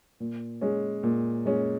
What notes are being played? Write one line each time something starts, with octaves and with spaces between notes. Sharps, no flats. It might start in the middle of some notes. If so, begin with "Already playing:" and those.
A#2
G#3 C#4
A#2
G#3 C#4